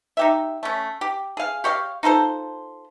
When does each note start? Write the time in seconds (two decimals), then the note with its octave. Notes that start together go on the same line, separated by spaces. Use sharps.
0.17 D#4 G4 E5
0.63 A3 C#4
1.01 G4
1.37 G#4 F5
1.64 G4 C#5 D#5 F5
2.03 D#4 F4 A4 C5